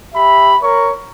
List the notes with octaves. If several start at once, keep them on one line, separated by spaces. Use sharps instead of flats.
G4 E5 B5
A#4 C#5 C#6